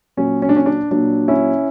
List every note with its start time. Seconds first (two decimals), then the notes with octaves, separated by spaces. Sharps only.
0.17 A#2 F#3 C#4
0.42 C#4
0.49 D4
0.56 C#4
0.66 D4
0.91 A#2 F#3 D4
1.28 C#4 E4